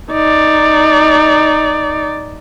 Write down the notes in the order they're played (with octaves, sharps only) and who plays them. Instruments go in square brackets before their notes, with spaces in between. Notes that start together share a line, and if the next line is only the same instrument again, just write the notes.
[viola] D#4 D5